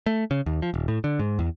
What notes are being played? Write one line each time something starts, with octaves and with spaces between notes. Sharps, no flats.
A3
C#3
D#2
F3
D#1
A2
D3
G#2
E2